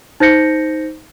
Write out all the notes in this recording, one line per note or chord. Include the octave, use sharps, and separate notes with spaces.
D#4 C5 G6 A#6 C#7